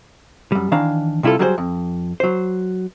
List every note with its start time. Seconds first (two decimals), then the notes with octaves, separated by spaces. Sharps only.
0.52 F#2 G3
0.72 D#3 E3 D4 F5 A#5
1.23 C3 G3 E4 F4 A4
1.39 F#3 G3 F#4 G#4 A#4 C5
1.58 F2
2.20 F#3 C5